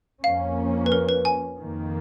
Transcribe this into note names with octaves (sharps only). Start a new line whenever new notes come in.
F2 F3 A#3 C#4 F5
B4
A#4
B4
G#5
F2 D#3 A#3